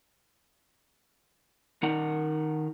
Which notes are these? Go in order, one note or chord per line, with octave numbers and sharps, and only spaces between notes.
D#3 D#4 A#4 F#5